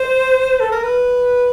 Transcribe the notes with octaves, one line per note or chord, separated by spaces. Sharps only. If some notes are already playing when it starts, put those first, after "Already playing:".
Already playing: C5
A4
A#4
B4